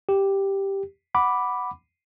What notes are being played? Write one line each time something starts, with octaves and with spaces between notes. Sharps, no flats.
G4
F#5 B5 D6